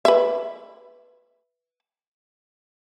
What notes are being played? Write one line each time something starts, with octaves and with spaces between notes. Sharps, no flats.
B4 E5